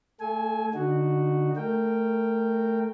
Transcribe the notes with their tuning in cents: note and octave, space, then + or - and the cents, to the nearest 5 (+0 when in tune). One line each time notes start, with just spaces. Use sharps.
A3 +20 A4 -35 G#5 +0
D3 +0 D#4 -20 F#4 +0
A3 +0 A#4 -15 G5 +0